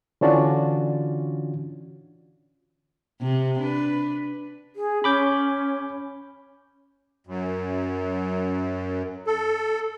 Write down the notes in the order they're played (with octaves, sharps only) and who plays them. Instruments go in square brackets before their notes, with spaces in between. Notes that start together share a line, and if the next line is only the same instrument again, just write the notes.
[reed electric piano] D3 E3 C#4 D4 F4 F#4
[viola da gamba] C3
D4 B4
[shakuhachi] G#4
[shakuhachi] C#4 [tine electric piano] B5 D6 G6
[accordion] F#2
A4